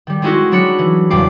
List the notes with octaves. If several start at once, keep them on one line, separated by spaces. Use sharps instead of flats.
D#3 G3
G#3 C4 D#4 E4 F#4 G#4
F#3 D4 B5 C#7
E3
F#1 E2 A#2 G3 D6 C7